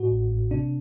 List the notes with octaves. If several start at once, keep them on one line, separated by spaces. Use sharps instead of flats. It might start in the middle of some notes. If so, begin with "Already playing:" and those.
Already playing: A2 F#4
A1
A1
C3 D4